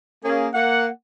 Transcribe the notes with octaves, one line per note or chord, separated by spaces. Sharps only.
A#3 C#4 G#4
A#3 F#5